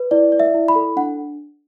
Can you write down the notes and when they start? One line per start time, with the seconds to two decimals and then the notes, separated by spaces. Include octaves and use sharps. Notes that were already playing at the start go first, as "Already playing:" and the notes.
Already playing: B4
0.11 E4 D5
0.32 D5
0.40 E5
0.54 E4
0.68 B5
0.75 A4
0.96 D4 F#5